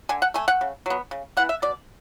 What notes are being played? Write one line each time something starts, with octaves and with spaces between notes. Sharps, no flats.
D3 G#5
F#5
A3 G#5
F#5
C#3
F#3 B3
C#3
E3 B3 F#5
E5
B2 D5